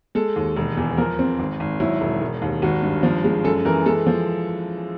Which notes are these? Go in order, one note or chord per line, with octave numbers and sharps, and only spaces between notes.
G#3 A4
D#2
E1
E2
F3 A#4
C4
G#1
G#1
F#3 E4
E1
E1
D#2
G#1 F#4
G2
F3
G#3
F#2 A4
E3 A#4
G#3 A4
F3